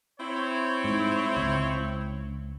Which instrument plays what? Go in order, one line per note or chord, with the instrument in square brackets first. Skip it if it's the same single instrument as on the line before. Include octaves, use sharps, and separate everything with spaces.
[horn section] C4 E4 C#5
[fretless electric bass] G#2
C#2